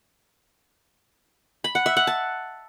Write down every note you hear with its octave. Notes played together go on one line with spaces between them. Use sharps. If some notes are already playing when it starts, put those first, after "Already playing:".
B5
F#5
E5
F#5
A5